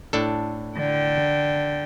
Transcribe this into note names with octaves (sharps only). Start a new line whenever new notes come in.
A2 D4 A4
D3 G5